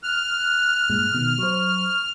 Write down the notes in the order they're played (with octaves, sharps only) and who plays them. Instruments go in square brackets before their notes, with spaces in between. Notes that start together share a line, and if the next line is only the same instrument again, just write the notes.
[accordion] F6 [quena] F#6
[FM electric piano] G2 A#2 G#3
B2 D#3
[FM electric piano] F#3 C5 [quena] C#6